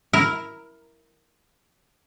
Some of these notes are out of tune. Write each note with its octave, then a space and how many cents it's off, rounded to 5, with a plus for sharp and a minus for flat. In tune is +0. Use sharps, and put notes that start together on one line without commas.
E4 +0 A#4 +0